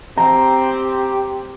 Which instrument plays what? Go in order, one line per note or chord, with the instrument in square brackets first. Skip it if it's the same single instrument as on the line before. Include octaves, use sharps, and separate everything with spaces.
[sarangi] C4 [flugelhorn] G4 [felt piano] A#5